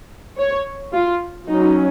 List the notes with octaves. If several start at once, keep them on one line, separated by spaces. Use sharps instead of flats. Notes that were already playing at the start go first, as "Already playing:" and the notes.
C#5
F4
F#3 C#4 D#4